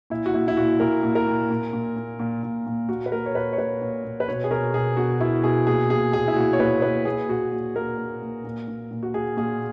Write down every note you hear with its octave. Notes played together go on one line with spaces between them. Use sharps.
A#2 E4
F#4
A#2 E4
E4
A#2 F#4
A#2 A#4
A#2
A#4
A#2
A#2
A#2
A#2
A#2
A#2
A#2
A#2 F#4
B4
A#2 A#4
C#5
A#2 B4
C#5
A#2 B4
A#2
A#2
B4
B2 C#5
G#4
B2 A#4
B2 G#4
B2 F#4
B2 E4
B2 G#4
A#2 G#4
A#2 G#4
A#2 G#4
E4
A#2 F#4
C#5
A#2 B4
A#2 B4
A#2 G#4
A#2 F#4
A#2
A#2 A#4
A#2
A#2
A#2
A#2
A#2
F#4
A#2 G#4
A#2 G#4